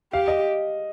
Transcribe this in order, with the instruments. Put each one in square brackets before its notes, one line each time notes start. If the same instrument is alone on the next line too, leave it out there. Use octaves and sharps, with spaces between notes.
[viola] G4 [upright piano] F5
[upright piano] D#5